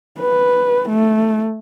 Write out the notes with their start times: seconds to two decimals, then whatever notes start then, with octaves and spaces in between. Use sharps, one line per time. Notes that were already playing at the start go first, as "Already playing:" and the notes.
0.20 B4
0.89 A3